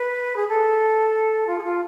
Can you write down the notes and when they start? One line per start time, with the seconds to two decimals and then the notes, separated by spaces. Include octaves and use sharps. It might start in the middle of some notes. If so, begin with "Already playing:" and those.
Already playing: B4
0.36 G#4
0.48 A4
1.47 F4
1.58 G#4
1.63 F4